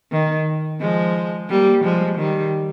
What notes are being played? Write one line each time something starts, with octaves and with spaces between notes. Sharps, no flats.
D#3
F3 G#3
G3 A#3
F3 G#3
D#3 G3